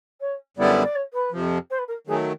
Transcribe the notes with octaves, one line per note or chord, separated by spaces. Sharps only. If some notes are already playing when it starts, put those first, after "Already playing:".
C#5
F#2 D3 G3 B3 E4 D5
D5
C#5
B4
F2 C3 F3
C5
B4
A#4
D#3 F#3 A3 G#4